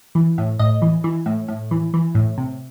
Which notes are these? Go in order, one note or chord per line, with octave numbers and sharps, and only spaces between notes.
E3
A2
A2 D#5
E3
E3
A2
A2
E3
E3
A2
C3